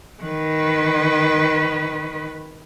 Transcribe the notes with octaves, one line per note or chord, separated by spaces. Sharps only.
D#3 B4